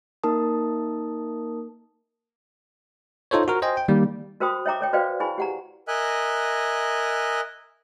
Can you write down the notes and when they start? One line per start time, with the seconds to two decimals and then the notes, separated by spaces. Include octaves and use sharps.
0.24 A#3 D#4 A#4 A5 D#6
3.31 D#4 F4 A4 C5 C#5
3.48 F#4 A#4
3.62 C5 D#5 G5 G#5
3.77 G5
3.88 D#3 G3 A#3
4.40 F#4 A#4 C5 G5 B5 D#6
4.66 C#5 E5 G5 A#5 D6
4.81 A4 C#5 G5
4.93 F#4 B4 C5 D5 F5 G5
5.20 E4 G#4 G#5 B5
5.38 G4 F#5 A#5
5.88 A#4 D#5 E5 G#5 F#6